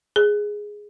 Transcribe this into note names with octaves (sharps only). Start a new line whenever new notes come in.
G#4